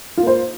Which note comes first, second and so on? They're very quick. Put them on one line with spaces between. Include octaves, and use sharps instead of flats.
F4 A#3 C5